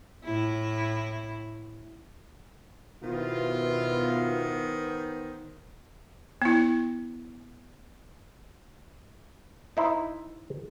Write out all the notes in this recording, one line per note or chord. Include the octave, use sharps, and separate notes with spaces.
A2 E4
B2 D#3 B3 E4 F4 C5
B3 E4
D#4 E4 C5